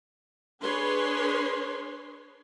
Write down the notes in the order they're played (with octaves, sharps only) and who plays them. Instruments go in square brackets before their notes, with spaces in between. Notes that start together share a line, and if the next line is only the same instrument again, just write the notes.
[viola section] D4 G#4 B4 C#5 C6